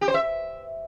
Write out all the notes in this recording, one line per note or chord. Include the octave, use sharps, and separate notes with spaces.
G4
C5
E5